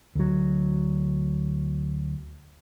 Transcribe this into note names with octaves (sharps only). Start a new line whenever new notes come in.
D2 F#3